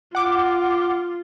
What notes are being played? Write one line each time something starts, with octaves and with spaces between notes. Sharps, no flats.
F4 F#5 D6